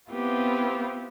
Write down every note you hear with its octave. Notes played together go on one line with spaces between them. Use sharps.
B3 C4 E4 F4 G4